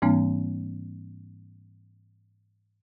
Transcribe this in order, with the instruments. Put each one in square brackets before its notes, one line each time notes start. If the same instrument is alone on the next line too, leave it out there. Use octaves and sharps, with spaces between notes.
[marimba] G#2 E3 G3 A#3 C4 D4